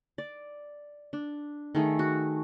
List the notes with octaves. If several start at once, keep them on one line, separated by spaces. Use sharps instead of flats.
D5
D4
D#3 A3 G#4
F#4